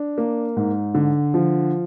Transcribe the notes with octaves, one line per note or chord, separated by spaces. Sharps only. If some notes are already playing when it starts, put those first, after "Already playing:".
Already playing: D4
A#3
G#2
D3
F3